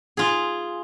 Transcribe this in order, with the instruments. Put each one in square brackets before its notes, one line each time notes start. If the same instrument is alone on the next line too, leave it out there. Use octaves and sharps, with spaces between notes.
[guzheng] F4 G#4